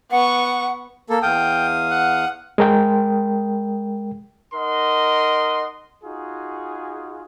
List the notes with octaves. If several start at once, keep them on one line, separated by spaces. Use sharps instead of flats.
B3 F#5 C#6
A#3 A4
E2 F5 G5 D#6
F#5
G#3 A#4 G5
D#4 A#4 D#5 F#5 C6
D#4 F4 F#4 G#4